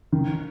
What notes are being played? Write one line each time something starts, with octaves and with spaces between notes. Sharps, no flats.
D#3